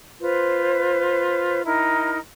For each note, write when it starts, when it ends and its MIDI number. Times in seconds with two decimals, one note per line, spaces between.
0.21 1.64 65
0.21 1.64 71
0.21 1.64 72
1.65 2.19 63
1.65 2.19 64
1.65 2.19 70